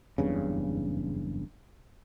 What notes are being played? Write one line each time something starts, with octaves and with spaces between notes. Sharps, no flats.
F#1 E2 G2 C#3